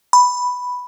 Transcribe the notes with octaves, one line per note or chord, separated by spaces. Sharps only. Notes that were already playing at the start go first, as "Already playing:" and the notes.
B5